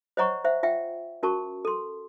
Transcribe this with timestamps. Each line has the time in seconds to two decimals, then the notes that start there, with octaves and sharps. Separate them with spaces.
0.17 C5 C#5 D#5 F#5 A#5 C#6
0.44 C5 E5 F#5
0.63 F4 E5 F#5 G5
1.23 C#4 F#4 A#4 A5 C#6
1.65 A4 C6